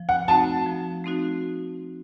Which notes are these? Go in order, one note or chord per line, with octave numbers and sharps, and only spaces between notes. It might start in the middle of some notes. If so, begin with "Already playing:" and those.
Already playing: F3
F#5
A3 C4 D#4 F#4 A5
F3
A3 C4 D#4 F#4